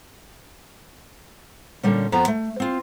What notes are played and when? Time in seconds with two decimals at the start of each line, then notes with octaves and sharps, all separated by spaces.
1.83 A#2 D3 G3 C#4
2.12 F2 F3 B3 A#5
2.28 A3
2.60 C4 F4